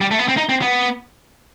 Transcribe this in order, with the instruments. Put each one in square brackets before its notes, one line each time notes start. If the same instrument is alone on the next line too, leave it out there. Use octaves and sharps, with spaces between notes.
[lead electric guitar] G3
A3
B3
C4
D#4
C4
B3